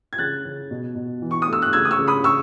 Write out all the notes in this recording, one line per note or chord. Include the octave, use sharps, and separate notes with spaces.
G#6
C#3 F#6 A6
C#3
B2
B2
E3
C#6
D#6
A3 E6
F#6
C#3 E6 G#6
D#6
C#6 E6
C#3
B5 D#6
C#3 C#6 E6